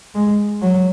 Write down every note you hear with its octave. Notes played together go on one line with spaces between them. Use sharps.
G#3
F#3